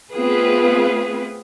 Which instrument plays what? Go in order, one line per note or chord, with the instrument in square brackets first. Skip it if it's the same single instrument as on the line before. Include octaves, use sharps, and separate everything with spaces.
[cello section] A3 B3 C4 F4 G#4 B4